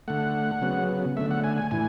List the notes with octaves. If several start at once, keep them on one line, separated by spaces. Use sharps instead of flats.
D3 A3 F#5
C#3 F#3 B3
D3 A3 E5
F#5
G#5
G#5
A2 E3 G#5